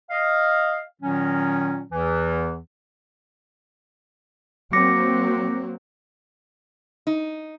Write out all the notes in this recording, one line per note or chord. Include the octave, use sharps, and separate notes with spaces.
D#5 F5
A#2 D#3 F#3 C#4
E2 E3
F#3 A#3 C4 D6 A#6 C#7
D#4